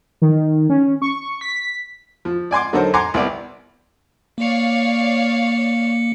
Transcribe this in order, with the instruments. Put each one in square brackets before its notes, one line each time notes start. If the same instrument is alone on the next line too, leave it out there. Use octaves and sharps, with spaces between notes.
[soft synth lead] D#3
C#4
C#6
B6
[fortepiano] F3
D5 G#5 C6 D6
D3 F#3 D#4 A4 A#4 C5
F#5 G#5 A#5 C6 D6
C2 B3 D5
[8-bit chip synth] A#3 C#7 [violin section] C#5 D5 F5